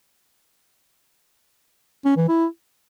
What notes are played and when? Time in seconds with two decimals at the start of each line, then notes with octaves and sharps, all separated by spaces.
2.05 C#4
2.17 E3
2.28 E4